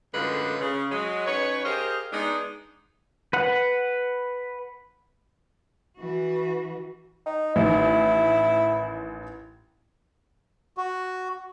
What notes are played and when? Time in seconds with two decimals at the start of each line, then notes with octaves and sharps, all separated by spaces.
0.14 F#2 A2 D3 G#3 F4 B4
0.61 C#3
0.91 F#3 G#3
1.27 F#3 C#4 D#4 B4 C#5
1.65 G4 G#4 A#4 C5 D#5 F5
2.12 G#3 B3 D4 D#4
3.33 B4 F#5
5.98 E3 F#4
7.26 D#4
7.56 A1 D#3 E4
10.77 F#4